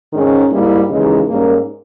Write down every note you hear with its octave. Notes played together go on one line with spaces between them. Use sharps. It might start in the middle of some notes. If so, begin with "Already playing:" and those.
G#2 D#3 G#3 C#4 D#4
G#2 G3 A#3 E4
D#2 C#3 E3 G#3 D#4
G#2 G3 A#3 C#4 A#4